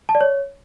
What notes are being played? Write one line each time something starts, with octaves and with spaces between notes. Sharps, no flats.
A5
D5
C#5